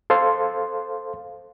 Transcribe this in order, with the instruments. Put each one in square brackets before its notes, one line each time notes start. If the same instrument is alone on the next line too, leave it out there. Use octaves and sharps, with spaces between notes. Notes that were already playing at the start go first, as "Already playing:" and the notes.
[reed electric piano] A4 C5 F5 C6